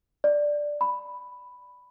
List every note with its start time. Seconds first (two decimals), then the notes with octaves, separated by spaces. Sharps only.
0.24 D5
0.81 B5